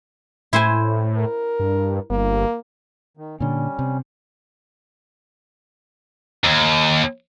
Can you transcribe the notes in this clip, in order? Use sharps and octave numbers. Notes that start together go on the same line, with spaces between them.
A2 E4 C5 G#5
A#4
G2
G1 A#3
D#3
A#2 D3 G3 C#4
C3
D#2